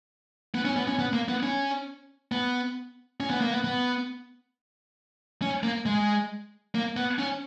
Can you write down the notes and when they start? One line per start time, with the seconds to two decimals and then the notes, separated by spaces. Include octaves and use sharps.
0.55 B3
0.65 C#4
0.76 B3
0.87 C#4
0.99 B3
1.13 A#3
1.28 B3
1.43 C#4
2.32 B3
3.20 C#4
3.30 B3
3.41 A#3
3.51 B3
3.65 B3
5.42 C#4
5.63 A#3
5.86 G#3
6.75 A#3
6.97 B3
7.19 C#4